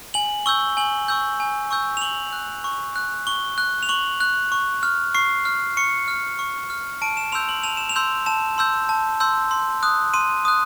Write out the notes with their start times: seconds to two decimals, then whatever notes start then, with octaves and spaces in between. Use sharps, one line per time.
0.14 G#5 F#7
0.46 C#6 E6 G6 G7
0.77 G#5 F#7
1.08 C#6 E6 G6
1.40 G#5
1.71 C#6 E6 G6
1.97 F7
2.01 C#6 F#7
2.33 F#6
2.64 C#6
2.96 F#6
3.27 C#6 G7
3.58 F#6
3.83 F7
3.89 C#6 F#7
4.20 F#6
4.52 C#6
4.83 F6
5.14 C#6 C7
5.45 F6
5.77 C#6 C#7
6.08 F6
6.39 C#6
6.70 F6
7.02 A5 D7
7.17 E7
7.32 C6 E6 G6 F7
7.49 F#7
7.63 A5 F7
7.77 E7
7.89 F7
7.96 C6 E6 G6
8.26 A5 E7
8.58 C6 E6 G6
8.89 A5
9.20 C6 E6 G6
9.51 C6
9.83 D#6 F#6
10.14 C6 D#7
10.45 D#6 F#6